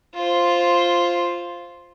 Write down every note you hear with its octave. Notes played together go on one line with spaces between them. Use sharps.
F4 C5